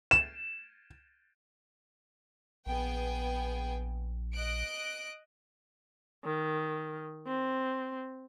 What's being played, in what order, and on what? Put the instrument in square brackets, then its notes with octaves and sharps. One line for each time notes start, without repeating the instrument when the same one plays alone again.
[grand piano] E7
[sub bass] A#1 [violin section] B3 G#4 G5
[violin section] D#5 F#6 D7
[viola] D#3
C4